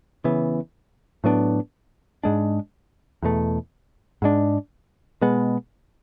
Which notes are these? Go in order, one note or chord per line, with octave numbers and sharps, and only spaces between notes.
C#3 E3 B3
A2 F#3 B3 D4
G#2 G#3 D4
E2 B2 A3
G#2 G#3 D4
B2 G#3 B3